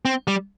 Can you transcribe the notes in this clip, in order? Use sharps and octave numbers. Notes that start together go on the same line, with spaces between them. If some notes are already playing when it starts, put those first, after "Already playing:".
C4
G3